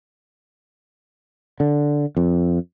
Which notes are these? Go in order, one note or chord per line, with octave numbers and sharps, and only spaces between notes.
D3
F2